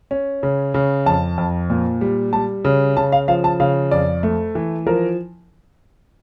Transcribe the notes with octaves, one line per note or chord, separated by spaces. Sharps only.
C#4
C#3
C#3
F2 A5
F2
A#2
G3
G3 A5
C#3
C#3 A5
F5
F3 F5
A5
C#3 F5
F2 D5
A3
E3
F3 A#4